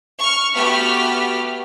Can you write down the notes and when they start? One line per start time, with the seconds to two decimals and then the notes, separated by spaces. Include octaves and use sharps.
0.20 C#6 F6
0.54 A3 B3 F#4 G4 F6 B6